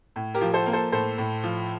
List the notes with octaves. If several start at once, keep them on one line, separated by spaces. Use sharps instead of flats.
A2
G4 A#4
F3
A4 C5
A#3
A4 C5
A2 A4 C5
A2
F3